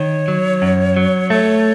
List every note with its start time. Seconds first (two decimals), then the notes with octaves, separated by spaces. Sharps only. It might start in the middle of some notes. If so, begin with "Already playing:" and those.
Already playing: D#3 C#5
0.28 F#3
0.62 F#2
0.97 F#3
1.30 A3 C#5